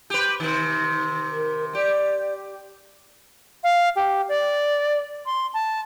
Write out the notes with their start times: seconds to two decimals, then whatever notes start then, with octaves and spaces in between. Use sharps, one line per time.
0.10 G4 B4
0.40 C3 D#3
1.32 A#4
1.75 G4 D5
3.64 F5
3.96 G4
4.29 D5
5.26 C6
5.54 A5